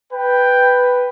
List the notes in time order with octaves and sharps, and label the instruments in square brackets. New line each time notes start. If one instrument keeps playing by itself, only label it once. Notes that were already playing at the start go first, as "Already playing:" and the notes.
[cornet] B4 [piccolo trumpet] G5